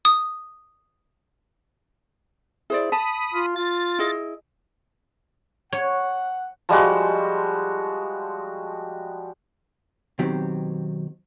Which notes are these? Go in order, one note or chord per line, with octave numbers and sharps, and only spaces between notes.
D#6
E4 G#4 C5 D5
A5 B5 D#6
F4
F4 A6
E4 G#4 D#5
C#5 F#5
F3 G3 G#3 F#4
B2 D#3 F#3 C4 G4